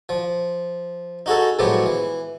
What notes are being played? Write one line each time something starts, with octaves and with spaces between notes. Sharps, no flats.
F3
D#4 F#4 G#4 A4
A2 F3 F#3 G#3 B3 G4
E3